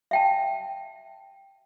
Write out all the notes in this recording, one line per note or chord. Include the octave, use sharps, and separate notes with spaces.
E5 G5 A5